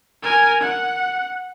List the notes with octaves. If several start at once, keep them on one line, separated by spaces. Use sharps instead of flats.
A#4 G#5
F#5